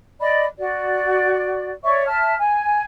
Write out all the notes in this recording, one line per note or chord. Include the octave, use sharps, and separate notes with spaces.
D5 D#5 B5
F#4 D5
C#5 D5 E5 C#6
E5 A5 F6
G#5